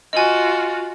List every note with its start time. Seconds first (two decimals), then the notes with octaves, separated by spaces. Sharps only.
0.13 F4 F#4 D#5 G#5